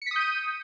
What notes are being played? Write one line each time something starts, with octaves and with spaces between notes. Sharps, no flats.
D#6 G6 B6 C#7 D#7